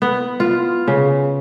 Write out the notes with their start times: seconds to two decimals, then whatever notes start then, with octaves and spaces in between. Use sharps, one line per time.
0.02 B3
0.40 F4
0.88 C#3